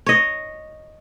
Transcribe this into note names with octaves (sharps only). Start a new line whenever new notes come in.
C#5 D#5